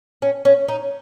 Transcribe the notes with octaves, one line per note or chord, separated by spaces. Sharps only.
C#4
C#4
D#4